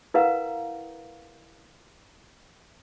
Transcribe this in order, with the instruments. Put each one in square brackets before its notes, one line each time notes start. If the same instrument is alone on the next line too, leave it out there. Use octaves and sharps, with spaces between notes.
[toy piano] E4 A#4 B4 F5 F#5 A#5